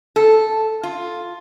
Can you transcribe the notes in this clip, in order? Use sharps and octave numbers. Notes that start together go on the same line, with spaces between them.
A4
F4